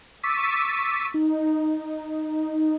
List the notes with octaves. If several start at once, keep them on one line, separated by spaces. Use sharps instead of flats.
C#6 D6 E6 A6 B6 D#7
D#4